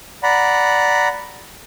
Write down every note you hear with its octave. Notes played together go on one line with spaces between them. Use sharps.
D5 F#5 A#5 B5